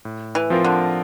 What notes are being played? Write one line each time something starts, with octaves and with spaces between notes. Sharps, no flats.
A2
E3
F3 C4 F4 A#4
D3